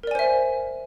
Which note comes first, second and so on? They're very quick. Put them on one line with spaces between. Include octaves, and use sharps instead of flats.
A#4 D5 G#5 C5 E5